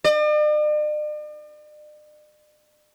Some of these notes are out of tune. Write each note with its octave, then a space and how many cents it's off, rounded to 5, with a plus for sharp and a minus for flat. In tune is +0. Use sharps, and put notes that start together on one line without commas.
D5 +45